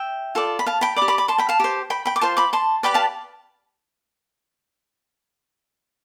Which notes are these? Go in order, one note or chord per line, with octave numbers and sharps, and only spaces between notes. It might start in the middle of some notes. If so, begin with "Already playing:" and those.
Already playing: E5 G5
F4 A4 D5
B5
F5 A5
G5 B5
D5 B5 D6
G4
B5 D6
B5 D6
A5 C6
G5 B5
F5 A5
G4 C5
G5 B5
G5 B5
D6
F4 C5 A5 C6
B5 D6
A5 C6
G4 B4 D5 G5 B5
F5 A5